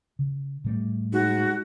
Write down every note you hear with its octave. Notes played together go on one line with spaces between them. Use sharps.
C#3
A2 G3 A3
G#2 F#4